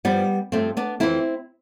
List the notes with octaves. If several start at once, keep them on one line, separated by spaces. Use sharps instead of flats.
G2 F3 G3 B3
G2 F3 A3 C4
B3 D4
F2 E3 C4 E4